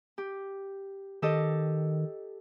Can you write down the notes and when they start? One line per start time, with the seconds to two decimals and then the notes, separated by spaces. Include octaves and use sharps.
0.18 G4
1.22 D#3 G4 A4 D#5